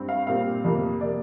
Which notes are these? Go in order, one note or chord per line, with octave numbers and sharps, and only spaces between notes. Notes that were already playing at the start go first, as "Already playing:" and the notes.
Already playing: G2 C4
F5
A#2 G3 C4 F5
F2 C3 F3 A#3
C3 A#3 D5